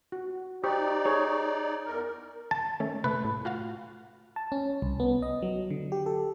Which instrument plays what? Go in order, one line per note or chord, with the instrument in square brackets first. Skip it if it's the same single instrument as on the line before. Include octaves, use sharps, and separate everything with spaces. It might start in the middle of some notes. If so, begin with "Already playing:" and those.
[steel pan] F#4
[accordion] D#4 D5 [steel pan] G4 C5 C#6
[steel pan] G#4 C#5
[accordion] E2 A#4
[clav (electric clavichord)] A5
[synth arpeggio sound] D#3 A3 C#4
[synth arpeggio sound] C3 A3 [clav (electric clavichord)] B4
[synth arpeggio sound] A2
F4 F#4 F5
[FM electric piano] A5
C#4
C2
B3
D#5
F#3
D3
G4
A4